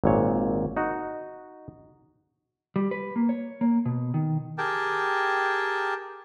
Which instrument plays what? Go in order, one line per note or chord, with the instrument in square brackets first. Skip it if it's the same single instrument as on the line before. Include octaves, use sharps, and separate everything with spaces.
[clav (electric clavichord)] G#1 A#2 C#5
D#4 F#4
[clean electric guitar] G3
B4
A#3
C#5
A#3
B2
D#3
[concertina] G4 G#4 A#4 G5 A5